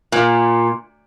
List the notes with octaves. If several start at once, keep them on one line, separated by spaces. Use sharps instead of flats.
A#2